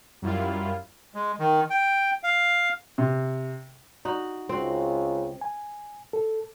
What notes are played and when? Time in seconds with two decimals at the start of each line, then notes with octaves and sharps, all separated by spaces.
0.22 F#2 G3 E4 F4
1.15 G#3
1.39 D#3
1.70 G5
2.23 F5
2.98 C3
4.05 D#4 F#4
4.49 C#2 C4 F#4
5.41 G#5
6.13 A4